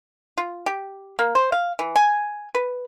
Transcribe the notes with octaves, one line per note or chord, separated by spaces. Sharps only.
F4
G4
A#3
C5
F5
E3
G#5
B4